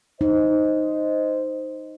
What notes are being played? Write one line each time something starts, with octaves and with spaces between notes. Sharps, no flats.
D#4 C5 D#5